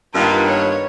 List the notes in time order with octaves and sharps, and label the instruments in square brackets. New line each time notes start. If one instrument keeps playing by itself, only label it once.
[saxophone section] G2 D#3 B3 [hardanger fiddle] A#3 F4
[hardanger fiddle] C#5